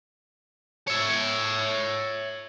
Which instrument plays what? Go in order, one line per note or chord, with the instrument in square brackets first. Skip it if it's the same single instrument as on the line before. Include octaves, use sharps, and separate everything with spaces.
[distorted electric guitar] C#5 E5